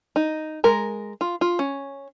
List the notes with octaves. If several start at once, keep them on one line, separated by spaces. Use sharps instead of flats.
D#4
G#3 A#4 A#5
F4
F4
C#4